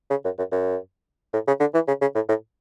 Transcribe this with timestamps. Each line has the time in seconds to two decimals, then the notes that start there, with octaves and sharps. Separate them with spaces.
0.10 C#3
0.25 F#2
0.38 F#2
0.52 F#2
1.33 A2
1.47 C#3
1.60 D3
1.74 E3
1.88 C#3
2.01 C#3
2.15 A2
2.29 A2